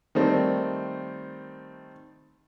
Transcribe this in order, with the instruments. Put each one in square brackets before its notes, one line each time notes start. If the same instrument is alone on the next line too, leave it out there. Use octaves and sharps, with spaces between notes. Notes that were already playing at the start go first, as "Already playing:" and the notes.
[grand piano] D#3 G3 A3 C4